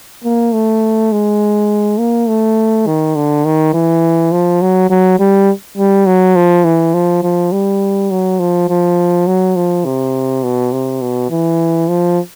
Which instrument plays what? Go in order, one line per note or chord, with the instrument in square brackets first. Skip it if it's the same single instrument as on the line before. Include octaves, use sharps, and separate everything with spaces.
[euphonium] A#3
A3
G#3
A#3
A3
D#3
D3
D#3
E3
F3
F#3
F#3
G3
G3
F#3
F3
E3
F3
F3
G3
F#3
F3
F3
F#3
F3
C3
B2
C3
B2
E3
F3